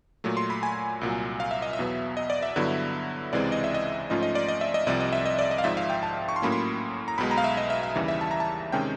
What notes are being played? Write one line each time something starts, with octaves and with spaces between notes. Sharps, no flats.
A#2 F#3 A3
C6
B5
G#5
C2 A#2 F#3
F5
E5
D#5
E5
E2 B2 F#3 B3
D#5
D5
E5
G2 D3 F#3 B3 E4
C#2 C3 E3 G#3 C4 D5
D#5
E5
D#5
G#2 F3 A3 C#4 F4 D#5
D#5
D5
D#5
E5
D#5
C2 C3 F3 D5
D#5
E5
D#5
D5
D#5
F5
G#1 G#2 F3 E5
F5
G5
A5
C#6
C6
A2 F#3 A#3 C#4 F4 B5
C6
A#5
B1 B2 G#3 B5
A#5
F5
E5
D#5
E5
F5
D#2 C#3 E3 G3
E5
A5
A#5
A5
C3 D#3 G#3 C#4 G5